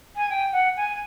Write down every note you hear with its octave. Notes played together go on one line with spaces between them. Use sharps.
G#5
G5
F#5
G#5